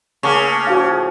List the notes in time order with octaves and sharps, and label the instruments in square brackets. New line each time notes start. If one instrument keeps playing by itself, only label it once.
[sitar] C#3 [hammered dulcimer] A3 A#3 C#4 [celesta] G#5 C#6
[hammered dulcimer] A2 F3 C#4 [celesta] F#4 F5